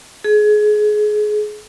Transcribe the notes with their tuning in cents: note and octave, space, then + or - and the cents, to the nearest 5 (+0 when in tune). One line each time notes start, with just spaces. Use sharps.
G#4 +25